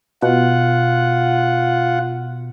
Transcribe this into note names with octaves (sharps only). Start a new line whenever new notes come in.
B2 F4 F#5